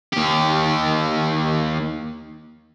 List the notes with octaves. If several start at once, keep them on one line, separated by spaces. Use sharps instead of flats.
D#2 G4